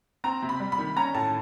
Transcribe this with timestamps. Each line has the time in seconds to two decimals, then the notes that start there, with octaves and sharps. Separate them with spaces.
0.24 C4 A#5
0.42 C3
0.49 B5
0.60 G3
0.72 B5
0.78 D#3
0.96 C#4 A#5
1.14 A2 A5